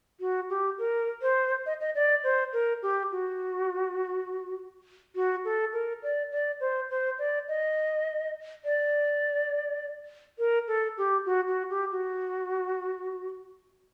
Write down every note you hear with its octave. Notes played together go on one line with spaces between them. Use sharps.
F#4
G4
A#4
C5
D#5
D#5
D5
C5
A#4
G4
F#4
F#4
A4
A#4
D5
D5
C5
C5
D5
D#5
D5
A#4
A4
G4
F#4
F#4
G4
F#4